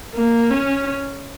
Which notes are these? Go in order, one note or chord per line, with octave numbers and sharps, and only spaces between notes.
A#3
C#4